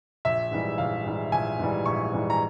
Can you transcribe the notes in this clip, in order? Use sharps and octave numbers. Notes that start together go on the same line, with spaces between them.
A#1 E5
G#2 E3 G3
A#1 F5
G#2 E3 G3
A#1 G#5
G#2 E3 G3
A#1 C#6
G#2 E3 G3
A#5